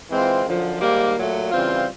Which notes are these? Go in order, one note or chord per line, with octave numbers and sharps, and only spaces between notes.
E3 G#3 C4 F4
F#2 D3 F3
G#2 D#3 G3 A#3
A#2 F#3 A3
C#3 E3 G3 C4 F4